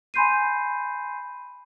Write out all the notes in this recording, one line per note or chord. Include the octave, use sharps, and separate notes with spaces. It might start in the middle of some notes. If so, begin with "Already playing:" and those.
G#5 B5 C6 G6 C7 D#7